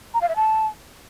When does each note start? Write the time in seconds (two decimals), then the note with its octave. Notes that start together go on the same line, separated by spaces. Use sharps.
0.14 A#5
0.21 F5
0.29 E5
0.36 A5